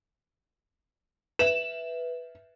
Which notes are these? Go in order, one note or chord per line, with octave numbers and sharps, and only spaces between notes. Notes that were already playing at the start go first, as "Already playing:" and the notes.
B4 E5 E7